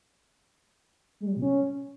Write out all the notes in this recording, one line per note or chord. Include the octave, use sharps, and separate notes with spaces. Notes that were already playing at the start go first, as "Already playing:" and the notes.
G#3
G3
F#3
B2
C#4